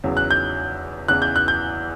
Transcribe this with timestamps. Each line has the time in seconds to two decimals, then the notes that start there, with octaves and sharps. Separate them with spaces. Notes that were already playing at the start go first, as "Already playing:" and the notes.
0.04 E2 C#3 F#3
0.17 F#6
0.31 G6
1.08 E2 C#3 E3 F#6
1.22 G6
1.36 F#6
1.48 G6